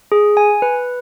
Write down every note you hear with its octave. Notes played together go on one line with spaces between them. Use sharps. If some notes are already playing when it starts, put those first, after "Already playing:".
G#4
G#5
B4